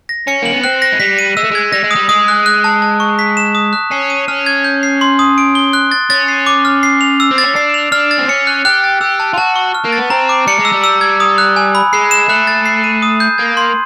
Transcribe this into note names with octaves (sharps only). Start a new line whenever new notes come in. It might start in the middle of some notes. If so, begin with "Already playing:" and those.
A#6
C#4 C#7
A#3 F#7
B3
C4 F#6
A#6
G#3
G3 B6
D#7
G#3 E6
A3
G#3 G#6
G3 A#6
G#3
G3 D#6
G#3 D#6
F#6
F#6
A5
A5
C#6
B6
E7
D#6
F#6
C#4 C7
D#7
C#4 F6
G#6
G6
C7
C6
D#6
D7
G7
F#6
A6
C#4 A6
C7
D6
F6
C7
F7
E6
C4
A6
C#4
D4 C7
F7
D4 F6
A6
C4
C#4 C#7
F#6
G4 F#6
A6
G4 E6
A5
F4
F#4 A5
C#6
F6
A#3
B3 A6
C4 A#5
D6
G3 C#7
G#3
E6
G3
E6
G#6
D#6
F#6
G#5
B5
G#3 C7
E7
A3 F#6
A6
C7
D#7
D#6
G6
A#3 G#6
C6